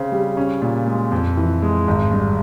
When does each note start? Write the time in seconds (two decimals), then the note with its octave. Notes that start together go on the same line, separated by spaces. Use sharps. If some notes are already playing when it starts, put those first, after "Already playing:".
Already playing: C#3 C4
0.12 G3
0.37 C#4
0.62 A#2
0.88 G#3
1.12 F2
1.37 E3
1.63 G#3
1.88 G#1
2.11 G2